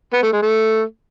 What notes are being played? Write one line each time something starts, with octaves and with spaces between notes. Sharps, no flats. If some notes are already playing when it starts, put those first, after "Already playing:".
B3
A3
G#3
A3